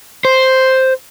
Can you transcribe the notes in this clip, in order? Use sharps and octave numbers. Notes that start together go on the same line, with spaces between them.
C5